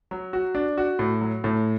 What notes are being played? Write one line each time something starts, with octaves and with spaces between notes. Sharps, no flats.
F#3
F#4
D4
F#4
A2
F#3
A2